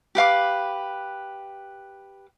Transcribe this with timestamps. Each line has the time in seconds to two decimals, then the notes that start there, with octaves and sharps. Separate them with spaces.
0.15 G4 B4 F5 D6